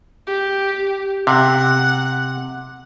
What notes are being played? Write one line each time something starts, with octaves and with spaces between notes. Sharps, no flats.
G4
C3 F#5